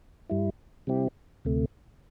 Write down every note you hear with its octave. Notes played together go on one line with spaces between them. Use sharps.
G2 G3 E4
C3 G3 C4 E4 G4
D2 C3 A3